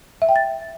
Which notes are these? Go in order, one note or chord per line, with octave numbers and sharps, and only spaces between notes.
E5
G5
A6